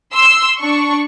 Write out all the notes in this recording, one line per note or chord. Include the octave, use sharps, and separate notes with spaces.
C6 E6
D4 C#6